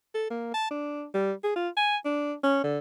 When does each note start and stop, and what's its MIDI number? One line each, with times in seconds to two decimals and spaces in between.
0.14 0.25 69
0.30 0.51 58
0.54 0.69 81
0.70 1.05 62
1.14 1.32 55
1.43 1.56 68
1.56 1.69 65
1.77 1.97 80
2.05 2.34 62
2.43 2.61 61
2.64 2.79 50